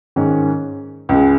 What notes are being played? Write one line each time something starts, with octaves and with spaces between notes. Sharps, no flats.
G#2 D#3 G#3 C#4
C#2 C#3 G#3